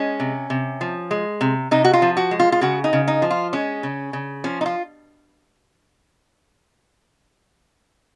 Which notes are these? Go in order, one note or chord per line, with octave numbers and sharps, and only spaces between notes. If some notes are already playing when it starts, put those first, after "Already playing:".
Already playing: G#3 C#4
C3
C3
F3
G#3
C3
C3 D#4
F#4
F4
F3
F#4
G#3
F4
F4
C#3 F#4
D#4
C#3
D#4
F3
F4
G#3 C#4
C#3
C#3
F3 C#4
D#4
F4